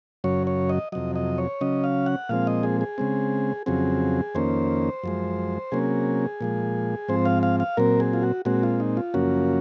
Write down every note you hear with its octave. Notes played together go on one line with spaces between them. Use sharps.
F#2 C#3 F#3 C#5
C#5
D#5
F2 C3 F#3 D#5
D#5
C#5
C#3 F#3 C#4 D#5
F5
F#5
A#2 F3 G#3 C4 F5
D#5
G#4
G#4
C#3 G#3 C4
F2 C#3 F#3 C4 G#4
F2 D#3 A#3 C#4 C5
F#2 F3 G#3
C3 F#3 A#3 C#4 G#4
A#2 F3 G#3
G#2 F3 C4 C5
F5
F5
F5
A#2 F#3 C4 A#4
G#4
F4
F#4
A#2 G#3 C4 F#4
F4
D#4
F4
F#2 C#3 F3 A#3 C#4 F#4